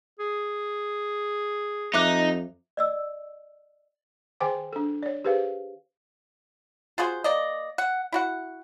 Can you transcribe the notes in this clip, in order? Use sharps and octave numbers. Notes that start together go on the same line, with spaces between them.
G#4
F2 D#4 E5 D6 F#6
D5 D#5 E6
D#3 G#4 C5 G5 G#5 D6
D4 A4
C#5 D5
G4 G#4 B4 C5 F5
F4 F#4 G#4 C5
A#3 D5 D#5
F#5
E4 F#4 F#5